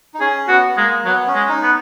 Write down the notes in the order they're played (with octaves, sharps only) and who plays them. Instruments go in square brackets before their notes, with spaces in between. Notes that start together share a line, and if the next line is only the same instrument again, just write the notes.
[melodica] D#4
[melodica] C#4 [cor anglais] G#4
[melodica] B3 [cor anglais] F#4
[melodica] B3
[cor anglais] G#3 [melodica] A#3
[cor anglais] F#3 [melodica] B3
[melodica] C#4
[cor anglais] G#3
[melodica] D#4
[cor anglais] B3